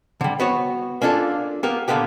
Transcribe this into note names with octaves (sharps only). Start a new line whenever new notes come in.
D3 G3
B3 F#4 C#5
A#3 C#4 D4 F4 A4
A#3 B3 G4 A#4
A#2 D3 A#3 B3 G4